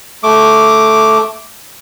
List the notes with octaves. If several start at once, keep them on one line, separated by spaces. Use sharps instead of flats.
A3 D6